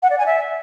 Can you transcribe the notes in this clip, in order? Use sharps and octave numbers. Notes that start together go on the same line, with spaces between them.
F#5
D5
G#5
E5